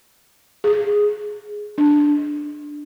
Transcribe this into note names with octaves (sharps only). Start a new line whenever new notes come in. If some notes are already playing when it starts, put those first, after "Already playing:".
G#4
D4